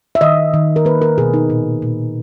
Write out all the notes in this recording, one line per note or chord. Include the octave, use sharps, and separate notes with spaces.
E5
D#3 D#5
D#3
A#4
A#3 B4
A#4
B2 G#4
D#4
A#2
A#2